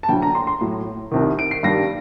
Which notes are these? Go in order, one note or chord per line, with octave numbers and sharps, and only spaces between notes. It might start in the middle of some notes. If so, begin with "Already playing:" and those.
A5
D2 D3 F#3 G5
A#5
C6
C6
A2 F#3
C2 C3 D#3
D7
C7
G2 D#3 G3 A#6